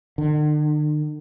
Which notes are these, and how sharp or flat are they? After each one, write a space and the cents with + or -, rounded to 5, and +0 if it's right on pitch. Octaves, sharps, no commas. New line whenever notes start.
D3 +45